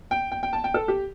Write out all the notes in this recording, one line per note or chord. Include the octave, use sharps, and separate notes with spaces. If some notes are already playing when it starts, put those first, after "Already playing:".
G5
G5
G5
A5
G5
A4
G4